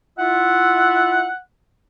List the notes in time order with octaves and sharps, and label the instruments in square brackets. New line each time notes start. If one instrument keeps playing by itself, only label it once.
[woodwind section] E4 F4 E5 [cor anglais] F#5